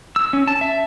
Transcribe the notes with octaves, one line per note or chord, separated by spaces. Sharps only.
E6
C#4
A5
E5